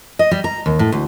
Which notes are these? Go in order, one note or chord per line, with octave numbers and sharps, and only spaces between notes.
D#5
G3
A#5
D#2
A2
D2